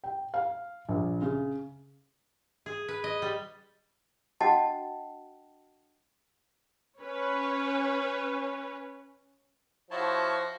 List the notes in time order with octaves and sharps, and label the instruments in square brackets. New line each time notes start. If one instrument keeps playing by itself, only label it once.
[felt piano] G5
F5
A#1
C#3
[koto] G#4
B4
D#5
G3
[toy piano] D4 F#4 D#5 F#5 G5 A5
[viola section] C#4 B4 C#5
[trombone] F3 [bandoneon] E4 C#5 A5 [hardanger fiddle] F#4 C5